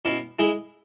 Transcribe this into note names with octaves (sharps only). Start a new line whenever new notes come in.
B2 C#4 E4
G#3 E4 G#4